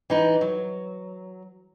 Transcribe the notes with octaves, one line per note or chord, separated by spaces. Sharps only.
E3 D#4 B4
F#3